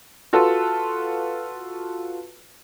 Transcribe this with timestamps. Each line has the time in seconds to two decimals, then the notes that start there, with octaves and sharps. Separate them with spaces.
0.33 F4 F#4 A4 B4